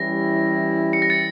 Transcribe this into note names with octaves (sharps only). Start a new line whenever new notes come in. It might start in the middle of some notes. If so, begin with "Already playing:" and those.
Already playing: E3 G3 C#4 E4 G4 A#6
C#7
A#6
A6 C#7